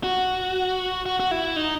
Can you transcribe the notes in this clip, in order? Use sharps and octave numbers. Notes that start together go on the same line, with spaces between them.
F#4
F#4
F#4
E4
D#4